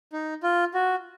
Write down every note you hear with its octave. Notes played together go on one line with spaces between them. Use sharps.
D#4
F4
F#4